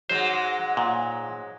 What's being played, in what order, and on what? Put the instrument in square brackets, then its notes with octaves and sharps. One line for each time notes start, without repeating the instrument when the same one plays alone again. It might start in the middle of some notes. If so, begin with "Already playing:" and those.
[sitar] G#2 F#3 G#3 [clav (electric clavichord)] C5
[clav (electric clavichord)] A#2